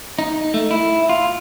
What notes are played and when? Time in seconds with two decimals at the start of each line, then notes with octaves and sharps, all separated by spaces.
0.19 D#4
0.54 A3
0.71 E4
1.09 F4